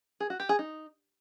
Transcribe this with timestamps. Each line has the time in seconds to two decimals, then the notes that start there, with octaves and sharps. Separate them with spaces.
0.20 G#4
0.30 F#4
0.40 G4
0.49 G#4
0.59 D#4